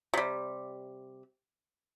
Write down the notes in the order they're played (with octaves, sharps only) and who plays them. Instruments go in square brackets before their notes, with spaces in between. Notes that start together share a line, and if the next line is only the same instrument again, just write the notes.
[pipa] C3 G3